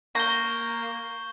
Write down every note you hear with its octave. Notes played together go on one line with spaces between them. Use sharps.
A#3 A#5 C#6 G6 G7